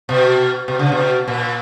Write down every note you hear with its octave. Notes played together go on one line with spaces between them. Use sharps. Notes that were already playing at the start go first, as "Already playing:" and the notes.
B2
B2
C#3
B2
A#2